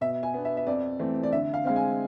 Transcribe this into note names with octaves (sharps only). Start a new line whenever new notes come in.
B2 E5
G#5
B3 D4
E5
E5
F2 D5
E3 A3 C4
D5
D3 E5
F5
G#3 C4 F5
G#5